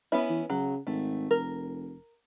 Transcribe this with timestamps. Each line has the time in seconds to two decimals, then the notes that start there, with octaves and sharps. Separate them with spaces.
0.12 B3 C#4 E4
0.30 E3
0.50 C#3 F#3
0.87 G#1 A3
1.31 F1 A#4